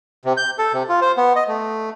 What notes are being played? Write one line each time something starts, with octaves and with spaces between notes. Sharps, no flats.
C3
G6
A4
C3
F4
C5
B3
D#5
A3